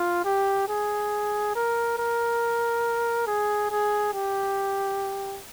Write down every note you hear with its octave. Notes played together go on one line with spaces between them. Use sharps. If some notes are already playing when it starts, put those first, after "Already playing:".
Already playing: F4
G4
G#4
A#4
A#4
G#4
G#4
G4